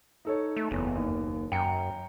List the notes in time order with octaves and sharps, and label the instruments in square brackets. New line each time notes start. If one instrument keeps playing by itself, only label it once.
[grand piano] D#4 A4 C#5
[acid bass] A3
[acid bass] F#1 [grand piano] E2
[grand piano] D#2
[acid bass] F#2 [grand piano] G5 A#5 C#7